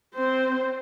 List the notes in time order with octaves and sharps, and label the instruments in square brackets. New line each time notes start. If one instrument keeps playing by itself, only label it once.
[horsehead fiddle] C4 C5